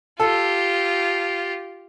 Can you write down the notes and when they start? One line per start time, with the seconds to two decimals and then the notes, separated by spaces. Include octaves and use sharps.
0.20 F4 G4 A4